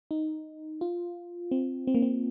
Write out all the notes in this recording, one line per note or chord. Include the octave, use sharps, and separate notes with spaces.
D#4
F4
C4
C4
A#3
C4